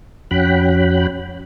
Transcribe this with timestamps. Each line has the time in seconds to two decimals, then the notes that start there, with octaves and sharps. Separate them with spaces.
0.31 F2 C#4 F#4 G5 B5 F#6